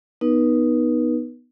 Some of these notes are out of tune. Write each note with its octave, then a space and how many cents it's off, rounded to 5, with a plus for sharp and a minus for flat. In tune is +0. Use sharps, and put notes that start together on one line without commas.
B3 +0 D#4 +0 B4 -40